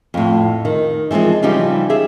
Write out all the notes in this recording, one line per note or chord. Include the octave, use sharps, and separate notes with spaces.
F2 A2
D#3
E3 F3 G3 G#3 C4
C#3 E3 F3 G3 D#4 G4
G4 G#4 E5